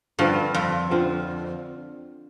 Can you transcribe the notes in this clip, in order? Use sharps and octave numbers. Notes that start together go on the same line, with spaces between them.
G2 D3 F3 C4 F4
F2
D3 F3 C4 F4